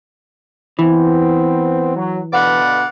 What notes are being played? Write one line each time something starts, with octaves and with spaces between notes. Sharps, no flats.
E3 B3 C4
F#3
B2 D3 B4 D5 F5 F#5